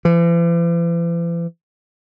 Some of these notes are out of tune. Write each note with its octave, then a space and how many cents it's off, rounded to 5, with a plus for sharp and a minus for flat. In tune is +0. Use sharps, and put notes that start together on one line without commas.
E3 +45